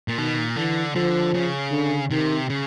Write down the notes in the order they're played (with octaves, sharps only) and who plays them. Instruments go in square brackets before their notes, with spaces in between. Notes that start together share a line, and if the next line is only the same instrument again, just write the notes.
[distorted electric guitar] A#2
[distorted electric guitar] B2 [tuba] D#3
[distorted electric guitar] A#2
[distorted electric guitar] D3 [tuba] E3
[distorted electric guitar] D3 [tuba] F3
[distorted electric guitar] C#3
[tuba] D3
[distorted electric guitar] C3 [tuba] D#3
[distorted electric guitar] C#3